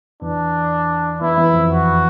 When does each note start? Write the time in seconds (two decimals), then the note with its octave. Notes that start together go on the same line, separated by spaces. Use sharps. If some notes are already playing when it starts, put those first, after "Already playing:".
0.22 E2 E3 D4
1.21 E2 E3 E4
1.37 E2 E3
1.54 F2 F3
1.71 F#4